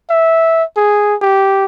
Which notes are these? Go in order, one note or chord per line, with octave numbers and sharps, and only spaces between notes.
E5
G#4
G4